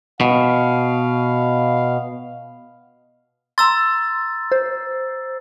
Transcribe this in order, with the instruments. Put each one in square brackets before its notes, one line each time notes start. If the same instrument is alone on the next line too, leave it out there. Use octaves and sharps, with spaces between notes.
[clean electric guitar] B2 [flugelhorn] F5
[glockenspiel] A#5 E6 A6 [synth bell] C6
[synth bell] C5